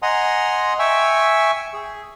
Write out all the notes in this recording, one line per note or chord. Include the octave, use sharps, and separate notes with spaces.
D#5 F#5 G#5 A#5 C6 D#6
E5 G5 G#5 C#6 E6
G#4